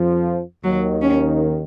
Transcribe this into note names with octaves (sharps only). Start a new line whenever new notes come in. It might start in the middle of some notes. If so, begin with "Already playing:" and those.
Already playing: F2 F3
D#2 D#3 F#3
C#4